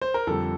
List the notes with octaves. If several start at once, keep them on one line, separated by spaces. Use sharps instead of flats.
C5
A#4
F2 D3 G3 A4